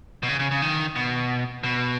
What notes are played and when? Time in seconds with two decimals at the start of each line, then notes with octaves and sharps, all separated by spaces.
0.23 B2
0.29 C#3
0.39 C#3
0.51 C#3
0.62 D#3
0.96 B2
1.64 B2